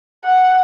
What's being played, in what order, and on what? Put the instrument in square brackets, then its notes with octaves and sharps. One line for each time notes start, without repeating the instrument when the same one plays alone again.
[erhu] F#5